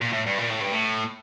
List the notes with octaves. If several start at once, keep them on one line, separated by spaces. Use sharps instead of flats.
A#2
A2
G2
A#2
A2
G2
A2